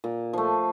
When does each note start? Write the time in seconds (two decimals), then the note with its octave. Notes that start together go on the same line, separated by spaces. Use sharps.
0.04 A#2
0.33 F3 A3